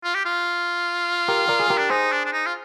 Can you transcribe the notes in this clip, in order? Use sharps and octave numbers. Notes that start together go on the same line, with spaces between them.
F4
G4
F4
G4 A#4
A#4 D5
G#4
G4 A#4
D4
D#4 G#4 C5
D4
D4
D#4
F4